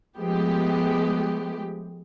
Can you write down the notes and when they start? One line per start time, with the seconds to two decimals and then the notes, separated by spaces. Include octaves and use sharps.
0.18 F3 G#3 A3 B3 G4